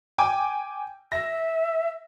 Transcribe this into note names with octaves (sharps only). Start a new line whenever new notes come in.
G5 G#5 D6
E5 A#6